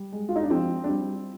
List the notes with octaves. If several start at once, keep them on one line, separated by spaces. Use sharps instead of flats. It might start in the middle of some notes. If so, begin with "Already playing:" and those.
Already playing: G3
G#3
F4
D#4
D4
F3 C4
D4
G3 C4